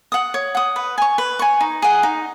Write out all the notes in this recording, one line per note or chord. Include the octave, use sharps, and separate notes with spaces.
F#5 D#6
C#5
F#5 D#6
B4
G#5 C#6
B4
G#5 C#6
D#4
G#4 D#5 F#5
D#4